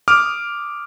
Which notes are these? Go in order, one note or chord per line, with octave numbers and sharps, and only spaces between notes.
D6 D#6 F6